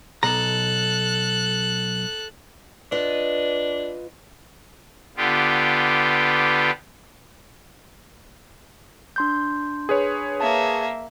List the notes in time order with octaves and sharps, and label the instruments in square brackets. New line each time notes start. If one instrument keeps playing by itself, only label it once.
[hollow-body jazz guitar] B1 A#5 [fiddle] A4 F#6
[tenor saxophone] D4 [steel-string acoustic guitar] F4 B4 D#5
[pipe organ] D3 B3 F4 G4
[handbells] D4 C6 G6
[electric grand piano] G#4 B4 C#5
[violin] A#3 E5 [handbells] A5